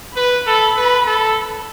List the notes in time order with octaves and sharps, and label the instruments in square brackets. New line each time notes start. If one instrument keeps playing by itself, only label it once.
[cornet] B4 [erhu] B5
[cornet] A4
B4
A4